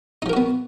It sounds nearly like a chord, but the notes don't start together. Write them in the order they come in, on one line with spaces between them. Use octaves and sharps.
D#4 F3 A#4 F#4 B3